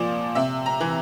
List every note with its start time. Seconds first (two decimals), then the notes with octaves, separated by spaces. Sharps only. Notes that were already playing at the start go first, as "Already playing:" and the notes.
Already playing: A#2 F3 D5
0.35 C3 E5
0.66 A#5
0.81 E3